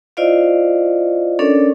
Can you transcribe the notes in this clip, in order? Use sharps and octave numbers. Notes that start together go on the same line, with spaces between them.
E4 F4 C5 D5 D#5 F5
C#4 D4 A4 A#4 C#5 D5